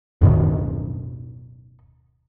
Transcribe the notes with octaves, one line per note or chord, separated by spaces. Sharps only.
D1 F#2 B2 D#3